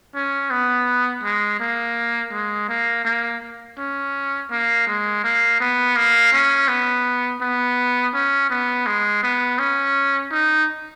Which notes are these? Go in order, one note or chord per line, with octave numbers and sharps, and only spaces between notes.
C#4
B3
G#3
A#3
G#3
A#3
A#3
C#4
A#3
G#3
A#3
B3
A#3
C#4
B3
B3
C#4
B3
G#3
B3
C#4
D#4